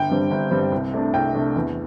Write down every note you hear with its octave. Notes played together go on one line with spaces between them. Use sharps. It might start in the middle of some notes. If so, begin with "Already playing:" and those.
Already playing: G1 G5
G2 G3 C4
G1
G2 G3 C4
C2
C3 A3 D4
C2 G5
C3 A3 D4
E2